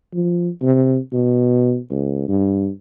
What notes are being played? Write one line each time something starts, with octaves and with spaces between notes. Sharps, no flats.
F3
C3
B2
C#2
G2